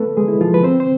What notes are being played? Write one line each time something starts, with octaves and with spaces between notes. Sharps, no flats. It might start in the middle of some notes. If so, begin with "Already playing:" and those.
Already playing: A3 B3 A4 B4
G#3 G#4
E4
F3 F4
B4
C4 C5
C5